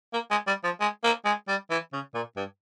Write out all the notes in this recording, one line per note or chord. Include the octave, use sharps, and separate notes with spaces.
A#3
G#3
G3
F3
G#3
A#3
G#3
G3
E3
C#3
A#2
G2